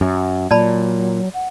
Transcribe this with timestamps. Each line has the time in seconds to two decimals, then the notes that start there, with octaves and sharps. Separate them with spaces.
0.01 F#2
0.51 A#2 F#3 D5 A5 B5
1.34 F#5